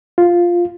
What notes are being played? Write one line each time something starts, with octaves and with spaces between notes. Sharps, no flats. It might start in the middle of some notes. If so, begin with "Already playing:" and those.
F4